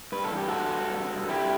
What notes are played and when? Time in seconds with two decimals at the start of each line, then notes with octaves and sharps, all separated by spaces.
0.12 G2 B4
0.24 A4
0.32 E3
0.37 G4
0.48 G2 F#4 A4
0.71 G2
0.90 G2
1.10 G2
1.29 D3 E4 G4